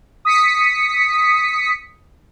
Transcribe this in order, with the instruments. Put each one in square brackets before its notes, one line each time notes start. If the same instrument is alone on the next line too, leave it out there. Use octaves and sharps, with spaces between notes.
[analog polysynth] D#6 B6 C#7